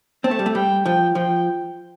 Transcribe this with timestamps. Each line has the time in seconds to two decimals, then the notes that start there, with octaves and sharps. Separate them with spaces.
0.24 C4 A5
0.31 A3
0.39 G3
0.46 A3
0.55 G3 G5
0.85 F3 G5
1.15 F3 G5